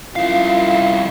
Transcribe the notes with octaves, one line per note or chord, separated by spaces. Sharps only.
C2 F#2 E4 F4 F5